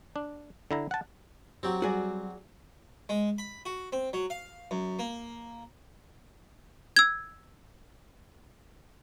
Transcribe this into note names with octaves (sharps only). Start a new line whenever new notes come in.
D4
D3 E4 A#5
F#5 A5
F#3 C4 G4
G3 F#4 G#4 D5
G#3
B5
F#4
C4
F#3
F5
F#2
A#3
E6 G#6